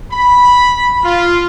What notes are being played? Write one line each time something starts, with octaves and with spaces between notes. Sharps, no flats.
B5
F4